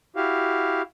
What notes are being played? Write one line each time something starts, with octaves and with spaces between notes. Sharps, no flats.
E4 F#4 G4 F5